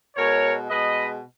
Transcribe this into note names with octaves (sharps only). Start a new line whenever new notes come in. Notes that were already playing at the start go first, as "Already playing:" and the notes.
B2 G#3 A#4 C#5
B2 G#3 B4 D#5